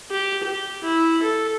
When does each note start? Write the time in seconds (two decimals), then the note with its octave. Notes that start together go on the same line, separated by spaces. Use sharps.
0.11 G4
0.43 G4
0.84 E4
1.22 A4